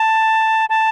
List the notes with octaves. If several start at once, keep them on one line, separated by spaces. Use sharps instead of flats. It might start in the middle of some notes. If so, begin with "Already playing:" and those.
Already playing: A5
A5